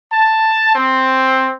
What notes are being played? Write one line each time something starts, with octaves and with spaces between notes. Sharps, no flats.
A5
C4